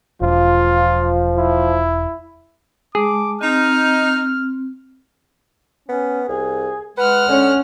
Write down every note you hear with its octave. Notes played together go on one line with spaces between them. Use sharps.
E1 F3 F4
E4
G#3 G#4 A5 D6
C4 D#4 F6
B3 C#4
C2 G#4
G#3 B4 F#5 F6
D3 C#4